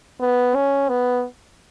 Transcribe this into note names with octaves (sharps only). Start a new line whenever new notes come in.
B3
C#4
B3